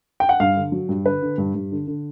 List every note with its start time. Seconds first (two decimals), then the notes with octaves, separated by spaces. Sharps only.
0.20 G5
0.29 F#5
0.40 G2 F5
0.56 D3
0.72 F#3
0.89 G2
1.05 D3 B4
1.22 D3
1.38 G2
1.55 G2
1.72 D3
1.87 D3